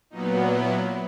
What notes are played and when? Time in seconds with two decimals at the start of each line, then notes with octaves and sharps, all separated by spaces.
0.10 A#2 F#3 B3 D#4
0.54 E4